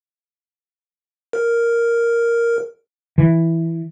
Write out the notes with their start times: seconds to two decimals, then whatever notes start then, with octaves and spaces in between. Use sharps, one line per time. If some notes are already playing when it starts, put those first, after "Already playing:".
1.33 A#4
3.18 E3